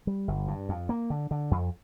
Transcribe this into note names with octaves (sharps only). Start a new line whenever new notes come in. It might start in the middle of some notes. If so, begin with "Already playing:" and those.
G3
G1
G2
F2
A#3
D3
D3
F2